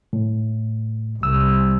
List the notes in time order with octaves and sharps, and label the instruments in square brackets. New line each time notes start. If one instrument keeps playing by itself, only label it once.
[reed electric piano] A2
[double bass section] C2 [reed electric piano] E6